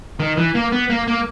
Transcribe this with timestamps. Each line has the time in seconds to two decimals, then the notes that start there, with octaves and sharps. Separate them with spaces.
0.20 D#3
0.37 E3
0.55 A#3
0.72 B3
0.90 A#3
1.08 A#3